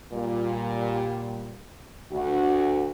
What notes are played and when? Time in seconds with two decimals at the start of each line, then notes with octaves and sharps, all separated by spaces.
0.13 A#2 G3
2.12 D2 F#4